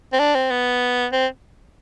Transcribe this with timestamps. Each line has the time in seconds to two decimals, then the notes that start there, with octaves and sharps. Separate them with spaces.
0.12 C4
0.19 D4
0.35 C4
0.51 B3
1.12 C4